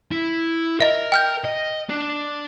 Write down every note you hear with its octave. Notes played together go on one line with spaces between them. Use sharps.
E4
A#4 D#5 E5
G5 F6 G6
D#5
D4